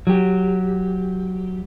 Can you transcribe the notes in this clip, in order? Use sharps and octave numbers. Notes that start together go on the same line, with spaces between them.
F#3 G4